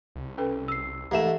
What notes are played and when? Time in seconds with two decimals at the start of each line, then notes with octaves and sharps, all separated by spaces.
0.16 C2
0.38 C#4 A4 B4
0.68 E6 C7
1.11 G#2 E3 A3 G4 E5 E7